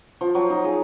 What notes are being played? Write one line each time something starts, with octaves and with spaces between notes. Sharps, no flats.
F3
F#3
D#4
G#4